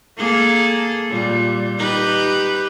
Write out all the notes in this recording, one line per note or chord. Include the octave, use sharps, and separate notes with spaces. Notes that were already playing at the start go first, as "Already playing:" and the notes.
A#3 G#4 A4
A#2 G3
D#4 G4 B4